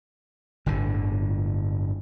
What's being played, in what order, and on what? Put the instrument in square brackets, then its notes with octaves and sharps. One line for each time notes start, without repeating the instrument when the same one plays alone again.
[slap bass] G1 A2 D3